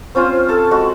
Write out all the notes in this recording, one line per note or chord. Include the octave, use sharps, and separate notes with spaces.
C4 C#4 F4 C5
A4 A5
G#3 F#4